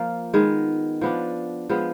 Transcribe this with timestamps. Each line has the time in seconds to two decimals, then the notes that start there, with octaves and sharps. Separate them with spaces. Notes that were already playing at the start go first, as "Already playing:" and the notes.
Already playing: F3 A#3 F4 A#4
0.34 D#3 G#3 B3
1.01 F3 B3 D4
1.69 F3 G#3 B3